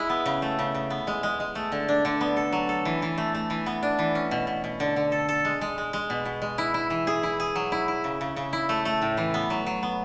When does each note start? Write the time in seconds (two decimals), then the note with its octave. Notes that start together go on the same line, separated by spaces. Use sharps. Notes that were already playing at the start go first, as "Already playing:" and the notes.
Already playing: G#3 E4
0.09 B3
0.26 C#3
0.42 A3
0.59 C#3
0.74 C#3
0.90 B3
1.07 G#3
1.23 G#3
1.40 G#3
1.55 A3
1.72 D3
1.89 D4
2.05 D3
2.21 B3
2.37 A4
2.52 F#3
2.69 A4
2.85 E3
3.02 E3
3.18 A3
3.35 A3
3.50 E3
3.66 B3
3.83 D4
3.99 E3
4.15 C#4
4.31 B2
4.47 B2
4.64 B2
4.80 D3
4.96 D3
5.12 A4
5.29 A4
5.45 G#3
5.61 G#3
5.78 G#3
5.93 G#3
6.10 B2
6.25 B2
6.42 G#3
6.58 E4
6.74 E4
6.90 E3
7.07 G#4
7.23 E4
7.40 G#4
7.55 F#3
7.72 E4
7.88 E4
8.04 C#3
8.21 C#3
8.36 C#3
8.53 E4
8.69 A3
8.85 A3
9.02 A2
9.17 E3
9.34 B3
9.50 F#3
9.66 F#3
9.83 B3